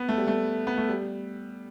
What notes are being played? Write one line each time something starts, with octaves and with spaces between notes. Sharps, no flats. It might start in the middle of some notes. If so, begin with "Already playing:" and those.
Already playing: B3
A3
G3
A3
B3
A3
G3